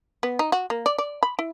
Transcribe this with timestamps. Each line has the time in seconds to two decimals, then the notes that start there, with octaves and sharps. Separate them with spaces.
0.23 B3
0.39 D#4
0.52 F#4
0.70 A#3
0.86 D5
0.98 D5
1.23 B5
1.39 E4